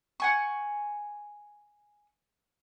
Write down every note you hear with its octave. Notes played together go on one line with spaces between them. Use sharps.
F#5 G#5 C#6